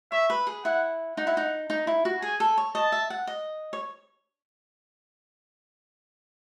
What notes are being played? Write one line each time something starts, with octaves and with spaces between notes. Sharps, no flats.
C#5 E5
B4
G#4
E4 F#5
D#4 F#5
E4
D#4
D#4
E4
F#4
G#4 G#5
A4
C#5
D#5 A5
E5
F#5
D#5
C#5